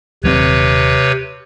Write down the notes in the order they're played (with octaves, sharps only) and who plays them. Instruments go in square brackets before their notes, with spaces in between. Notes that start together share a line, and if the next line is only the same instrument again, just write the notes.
[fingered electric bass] D#1 F#3 C4 [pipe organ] C3 B4 C#5